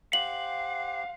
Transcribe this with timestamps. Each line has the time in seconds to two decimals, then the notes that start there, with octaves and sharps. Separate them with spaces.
0.13 G4 C5 F5 F#5 F#7